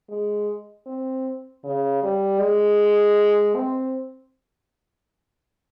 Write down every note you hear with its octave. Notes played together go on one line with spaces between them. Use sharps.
G#3
C4
C#3
G3
G#3
C4